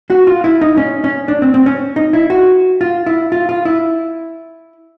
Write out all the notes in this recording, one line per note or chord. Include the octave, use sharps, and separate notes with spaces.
F#4
F4
E4
D#4
C#4
C#4
D4
C4
C4
C#4
D#4
E4
F#4
F4
E4
F4
F4
E4